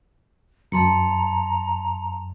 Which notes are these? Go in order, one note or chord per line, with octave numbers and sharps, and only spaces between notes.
F#2 A5 A#5 C6 C#7